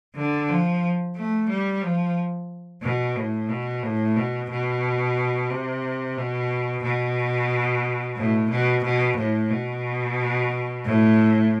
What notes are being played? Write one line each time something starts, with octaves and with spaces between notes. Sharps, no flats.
D3
F3
A3
G3
F3
B2
A2
B2
A2
B2
B2
C3
B2
B2
A2
B2
B2
A2
B2
A2